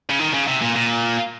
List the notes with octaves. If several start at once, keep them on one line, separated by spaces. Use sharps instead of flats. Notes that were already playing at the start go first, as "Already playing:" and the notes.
C#3
D#3
C#3
C3
A#2
A#2